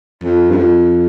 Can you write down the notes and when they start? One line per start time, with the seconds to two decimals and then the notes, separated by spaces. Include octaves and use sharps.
0.23 F2
0.50 G2
0.57 F2